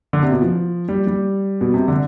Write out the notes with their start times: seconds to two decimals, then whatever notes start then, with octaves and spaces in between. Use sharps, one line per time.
0.13 D3
0.23 C3
0.32 B2
0.42 F3
0.89 G3
1.07 G3
1.61 B2
1.74 C3
1.88 D3